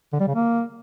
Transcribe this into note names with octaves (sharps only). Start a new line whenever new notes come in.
D3
G3
C#3
A#3